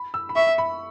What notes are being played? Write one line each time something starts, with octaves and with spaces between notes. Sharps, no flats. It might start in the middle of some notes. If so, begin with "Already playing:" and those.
Already playing: B5
E6
B5
E5 C#6
B5